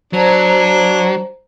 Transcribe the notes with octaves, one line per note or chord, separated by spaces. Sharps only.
F#3 D4 C5 C#5 A#5